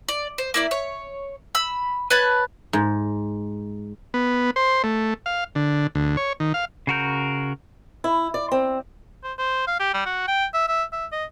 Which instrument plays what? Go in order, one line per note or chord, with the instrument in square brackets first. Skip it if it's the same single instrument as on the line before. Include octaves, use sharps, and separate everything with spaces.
[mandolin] D5
C5
A#3 E4 D5
C#5
B5 E6
B4 C#5 A5 B5
[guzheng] G#2
[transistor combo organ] B3
C5
A3
F5
D3
D2
C#5
D#3
F5
[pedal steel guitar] C#3 F#4 A#4 G6
[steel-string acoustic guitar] E4
D5
C4
[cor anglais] C5
C5
F5
G4
G3
F#4
G5
E5
E5
E5
D#5